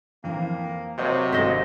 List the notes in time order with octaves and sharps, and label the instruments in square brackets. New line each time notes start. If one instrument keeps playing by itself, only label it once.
[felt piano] F2 E3 [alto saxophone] A#3
[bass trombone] C3 [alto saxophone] F#3 [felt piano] C5 D#5 G6
[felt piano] G#1 C6 B6 [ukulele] C5 D#5 F5